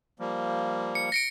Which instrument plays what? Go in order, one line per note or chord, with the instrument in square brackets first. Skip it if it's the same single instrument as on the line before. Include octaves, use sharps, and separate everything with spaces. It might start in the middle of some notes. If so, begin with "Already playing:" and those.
[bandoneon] F3 G3 A#3
[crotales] C#7
A#6 C#7 D7